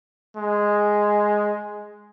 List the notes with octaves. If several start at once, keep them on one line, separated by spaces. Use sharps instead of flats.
G#3